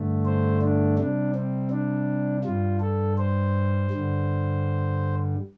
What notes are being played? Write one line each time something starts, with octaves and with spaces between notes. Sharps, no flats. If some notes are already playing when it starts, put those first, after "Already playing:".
Already playing: G2 D3 A3
C5
D4
C3 G3 D4
C4
D4
G2 G3 F4
A4
C5
G2 D3 G3